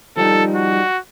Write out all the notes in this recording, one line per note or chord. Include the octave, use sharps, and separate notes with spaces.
F3 G3 D#4 A4
F#4